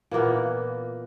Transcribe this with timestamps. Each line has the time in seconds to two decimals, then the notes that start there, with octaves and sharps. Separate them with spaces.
0.11 A#2 E3 A#3 B3